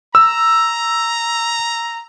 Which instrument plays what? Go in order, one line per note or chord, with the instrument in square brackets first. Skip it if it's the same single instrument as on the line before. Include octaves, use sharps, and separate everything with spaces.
[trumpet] A#5 [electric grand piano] E6